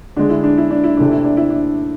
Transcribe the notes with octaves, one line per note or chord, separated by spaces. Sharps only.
D3 G#3 D4
E4
D4
E4
D4
E4
C3 E3 A3 D4
E4
D4
E4
D4